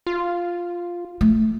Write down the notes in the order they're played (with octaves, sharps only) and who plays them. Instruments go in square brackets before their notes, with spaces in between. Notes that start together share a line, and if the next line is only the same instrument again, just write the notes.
[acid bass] F4
[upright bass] A3